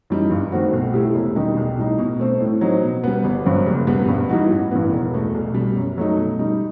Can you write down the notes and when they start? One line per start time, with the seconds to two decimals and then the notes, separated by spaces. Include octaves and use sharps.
0.10 F#2 E3 G3 D#4
0.31 G2
0.52 D#3 A3 C4 F#4
0.73 B1
0.94 B2 A3 E4 G4
1.15 E1
1.36 E2 D#3 G3 D#4
1.57 B1
1.78 A2 G3 D#4
1.99 B2
2.20 A3 C4
2.41 A2
2.61 F#3 C4 D#4
2.82 B2
3.04 G3 B3
3.24 G1
3.46 G2 F#3 C4
3.66 F#1
3.87 E2 B2 G3 B3
4.08 G2
4.29 E3 G3 D#4 F#4
4.50 A1
4.71 G2 E3 B3
4.92 E1
5.13 E2 B2 A3
5.34 B1
5.54 B2 G3
5.76 F#2
5.97 F#3 A3 D#4
6.18 B2
6.39 G3 D#4